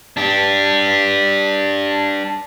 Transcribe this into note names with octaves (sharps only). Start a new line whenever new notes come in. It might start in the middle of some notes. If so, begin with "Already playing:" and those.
D4 G4